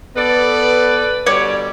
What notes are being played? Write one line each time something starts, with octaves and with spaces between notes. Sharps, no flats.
B3 A4 B4 D5
B2 D3 G3 C#5 D5